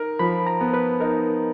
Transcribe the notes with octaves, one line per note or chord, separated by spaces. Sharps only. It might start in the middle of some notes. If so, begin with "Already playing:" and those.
Already playing: D#4 A#4
F3 B5
A#5
B3
B4
D#4 A#4